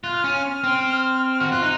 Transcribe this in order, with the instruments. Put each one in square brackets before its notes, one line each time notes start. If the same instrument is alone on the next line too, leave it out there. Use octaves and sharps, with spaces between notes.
[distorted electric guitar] F4 [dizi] F#6
[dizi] F6
[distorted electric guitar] C#4
C4
F#4
[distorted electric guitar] F4 [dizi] F#6
[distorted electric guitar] D#4 [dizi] F#6